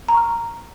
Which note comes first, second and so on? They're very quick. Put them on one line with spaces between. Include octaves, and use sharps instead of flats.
A#5 C6 C#6 F6